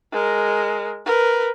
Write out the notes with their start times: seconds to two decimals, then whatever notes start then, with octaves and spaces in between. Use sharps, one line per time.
0.13 G#3 A#4
1.06 A#4 B4